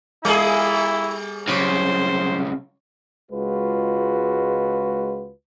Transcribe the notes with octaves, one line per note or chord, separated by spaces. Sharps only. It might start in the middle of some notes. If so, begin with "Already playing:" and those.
G3 E4 F4 G#4 A#4 F5
C2 C#3 F#3 C5 C#5 D6
C#2 G#3 F4 F#4 B4